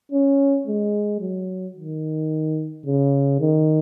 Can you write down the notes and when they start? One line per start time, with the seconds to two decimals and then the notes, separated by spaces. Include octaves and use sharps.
0.12 C#4
0.67 G#3
1.21 F#3
1.75 D#3
2.86 C#3
3.40 D#3